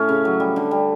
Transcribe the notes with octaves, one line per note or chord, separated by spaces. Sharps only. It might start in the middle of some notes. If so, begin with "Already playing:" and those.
Already playing: A2 A3 C#4
C#3
F#3
G3
D3
G3